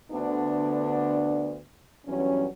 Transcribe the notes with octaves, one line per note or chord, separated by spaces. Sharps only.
D2 D3 B3 D4
E2 G2 F#3 C#4